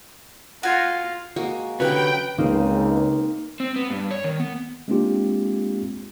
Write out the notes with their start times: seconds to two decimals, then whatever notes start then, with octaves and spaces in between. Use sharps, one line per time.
0.63 F4 F#4 G#5
1.36 G#3 A#3 F#4
1.80 D3 F#3 A#3 C#4 G4 B4 G5
2.38 C#2 A#3 C4 D#4
3.60 C4
3.76 B3
3.90 G2
4.11 C#5
4.24 D#3
4.40 B3
4.88 G#3 A#3 C4 D4 F4 G4